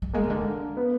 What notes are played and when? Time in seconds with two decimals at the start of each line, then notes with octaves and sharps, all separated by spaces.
0.02 G3
0.13 G#3 A#3
0.24 C#3
0.30 D3
0.77 B3